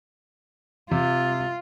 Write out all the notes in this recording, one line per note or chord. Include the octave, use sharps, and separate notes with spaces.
C3 F4